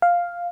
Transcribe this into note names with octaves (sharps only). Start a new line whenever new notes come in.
F5